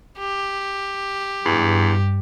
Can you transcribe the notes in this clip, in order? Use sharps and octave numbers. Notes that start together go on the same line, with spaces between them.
G4
E2 G2